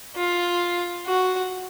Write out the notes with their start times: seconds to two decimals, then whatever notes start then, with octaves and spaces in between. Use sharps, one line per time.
0.17 F4
1.07 F#4